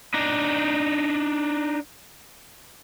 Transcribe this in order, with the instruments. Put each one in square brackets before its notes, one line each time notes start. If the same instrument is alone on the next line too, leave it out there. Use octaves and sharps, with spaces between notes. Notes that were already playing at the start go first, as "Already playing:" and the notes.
[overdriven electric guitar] D4 D#4